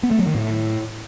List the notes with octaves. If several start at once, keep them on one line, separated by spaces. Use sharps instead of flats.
B3
A3
F#3
D#3
A2